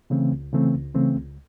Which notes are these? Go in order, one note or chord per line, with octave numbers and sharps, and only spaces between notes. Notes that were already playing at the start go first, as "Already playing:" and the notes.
C#3 E3 A3 C4
C#2
C#3 E3 A3 C4
C#2
C#3 E3 A3 C4
C#2